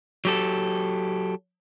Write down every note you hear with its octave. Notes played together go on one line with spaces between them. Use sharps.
F#3 G4 A4